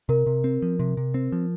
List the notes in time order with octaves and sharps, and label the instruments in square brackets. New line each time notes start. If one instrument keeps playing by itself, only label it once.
[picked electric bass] C3 [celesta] A#4
[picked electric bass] C3
C4
F3
C3
C3
C4
F3